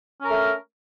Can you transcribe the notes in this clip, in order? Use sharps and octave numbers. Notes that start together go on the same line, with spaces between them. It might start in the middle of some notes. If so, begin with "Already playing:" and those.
A3 C#4 A#4